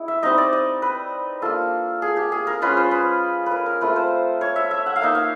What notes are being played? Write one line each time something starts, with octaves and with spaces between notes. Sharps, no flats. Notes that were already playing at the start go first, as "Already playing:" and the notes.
Already playing: G#3 E4
E5
G3 C4 D#4 D#5
D5
D#5
B4
A#3 D4 F4 A4
G#4
G4
G#4
A#4
G#3 C#4 F4 B4
C5
B4
B4
A#4
A#4
A3 C4 F4 B4
C5
C#5
E5
E5
F#5
F5
A#3 D#4 E5
F5